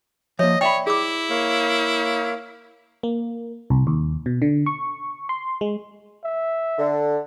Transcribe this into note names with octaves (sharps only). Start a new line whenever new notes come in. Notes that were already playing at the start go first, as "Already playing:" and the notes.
F3 A#3 C#5 D#5 E5
C#5 D5 E5 G5 B5
E4 G#4 D6
A#3 C#5 F5
A#3
C2
D#2
B2
D3
C#6
C6
G#3
E5
D3